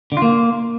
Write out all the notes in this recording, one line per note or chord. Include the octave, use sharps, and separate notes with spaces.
D3
F4
A#3